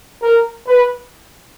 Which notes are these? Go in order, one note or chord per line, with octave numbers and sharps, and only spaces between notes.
A#4
B4